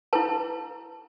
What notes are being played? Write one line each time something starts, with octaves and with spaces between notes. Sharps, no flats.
E4 B4 A5